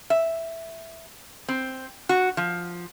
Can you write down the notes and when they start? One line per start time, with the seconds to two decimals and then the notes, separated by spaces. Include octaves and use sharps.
0.10 E5
1.49 C4
2.09 F#4
2.37 F3